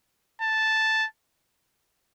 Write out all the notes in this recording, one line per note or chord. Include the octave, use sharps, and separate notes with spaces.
A5